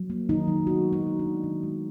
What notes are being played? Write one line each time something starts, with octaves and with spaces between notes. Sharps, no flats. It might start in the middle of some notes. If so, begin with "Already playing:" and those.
Already playing: F#3
A#3
D#3 D#4
F#3
B3 F#4
G#3
D#4
D#3
D4
D#3
D#3
G#3